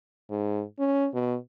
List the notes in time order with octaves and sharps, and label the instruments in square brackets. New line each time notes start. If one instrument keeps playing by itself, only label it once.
[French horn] G#2
C#4
B2